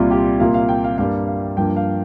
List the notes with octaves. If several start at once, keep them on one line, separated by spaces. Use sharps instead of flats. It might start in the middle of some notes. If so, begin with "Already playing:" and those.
Already playing: C2 A#2 G3 F4
G4
C2 A#2 A#3 F5
F5
G5
F5
G2 G3 A#3 F5
F5
G2 F3 A#3 G5
F5